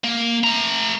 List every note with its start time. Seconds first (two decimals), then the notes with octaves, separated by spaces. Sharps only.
0.04 A#3
0.44 A3 A#5